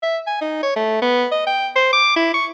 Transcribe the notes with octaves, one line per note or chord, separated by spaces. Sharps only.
E5
G#5
D#4
C#5
A3
B3
D#5
G5
C5
D6
E4
C#6